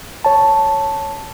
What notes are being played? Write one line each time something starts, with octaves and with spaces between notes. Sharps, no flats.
C#5 A5